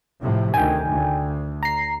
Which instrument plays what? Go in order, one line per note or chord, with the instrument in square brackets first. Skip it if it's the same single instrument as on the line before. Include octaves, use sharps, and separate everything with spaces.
[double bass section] A2 C3 F3
[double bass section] D2 D#3 [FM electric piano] G5 G#5
[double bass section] D2
[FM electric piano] A#5 C7